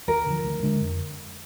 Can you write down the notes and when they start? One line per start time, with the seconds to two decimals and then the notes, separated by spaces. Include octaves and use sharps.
0.08 D#2 A#4
0.26 D3 F3
0.45 D2
0.63 D3 G#3 D4
0.81 F2